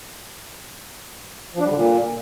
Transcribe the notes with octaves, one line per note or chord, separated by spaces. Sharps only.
F3
D4
G3
D3
A#2